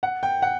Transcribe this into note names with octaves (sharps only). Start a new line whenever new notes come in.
F#5
G5
F#5